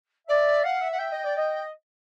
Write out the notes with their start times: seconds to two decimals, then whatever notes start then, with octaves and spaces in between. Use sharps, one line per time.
0.28 D5 E5
0.63 F5 F#5
0.81 E5
0.91 F#5
0.98 E5 G5
1.11 D#5
1.24 D5
1.37 D#5